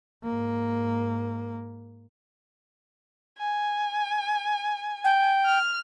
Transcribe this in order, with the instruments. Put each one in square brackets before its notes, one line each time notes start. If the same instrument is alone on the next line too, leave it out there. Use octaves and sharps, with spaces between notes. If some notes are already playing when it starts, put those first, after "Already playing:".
[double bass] G#2 A#3
[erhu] G#5
[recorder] G5
[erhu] F6